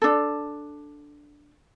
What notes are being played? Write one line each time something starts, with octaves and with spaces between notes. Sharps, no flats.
D4 A4